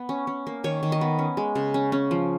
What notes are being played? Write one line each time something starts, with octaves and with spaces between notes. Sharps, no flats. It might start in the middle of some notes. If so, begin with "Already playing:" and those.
Already playing: B3
C#4
C#4
A#3
D#3 C#5
D#3
D#5
B3
C#4
G#3
C#3
C#4
C#4
F3